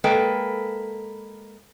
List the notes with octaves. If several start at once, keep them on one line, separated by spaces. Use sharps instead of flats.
G#3 A#3 A4 B4 G5